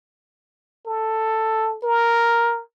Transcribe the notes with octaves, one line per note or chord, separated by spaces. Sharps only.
A4
A#4